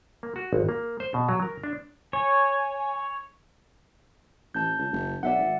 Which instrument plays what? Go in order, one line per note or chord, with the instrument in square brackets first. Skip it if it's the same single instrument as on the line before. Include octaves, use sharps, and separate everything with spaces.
[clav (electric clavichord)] A#3
F#4
G#1
A#3
C5
B2
F#3
A#4
D4
[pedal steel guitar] C#5 [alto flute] G#5
[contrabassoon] A1 [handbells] A5 G6
[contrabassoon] C#2
F#1
[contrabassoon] B1 [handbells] D5 E5 F#5
[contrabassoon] G#1